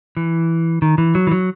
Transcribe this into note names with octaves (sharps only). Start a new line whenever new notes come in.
E3
D#3
E3
F#3
E3
F#3